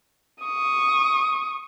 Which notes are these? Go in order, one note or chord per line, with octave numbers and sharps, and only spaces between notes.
C#6 D#6